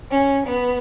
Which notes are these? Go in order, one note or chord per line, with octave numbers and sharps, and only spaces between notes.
C#4
B3